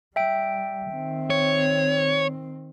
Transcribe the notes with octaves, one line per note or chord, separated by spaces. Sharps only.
G3 E5 G5 D7
D#3 C4
C#5